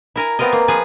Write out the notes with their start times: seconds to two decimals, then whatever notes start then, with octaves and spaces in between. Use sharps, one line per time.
0.16 E4 A#4 G#5
0.39 B3 C4 F4 A#4 D#5
0.53 A#3
0.68 F3 G#4 B4 G#5